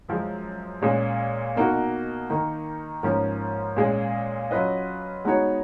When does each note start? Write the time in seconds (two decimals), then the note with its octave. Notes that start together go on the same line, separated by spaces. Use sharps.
0.09 F#2 F3 G#3
0.82 A#2 G#3 C#4 G#4
1.56 B2 A#3 D#4 F#4
2.30 D#3 A#3 D#4
3.03 G#2 F3 A#3 C#4
3.77 A#2 G#3 C#4 G#4
4.51 F#3 C#4 F4 B4 D#5
5.25 G#3 B3 D#4 F#4 C#5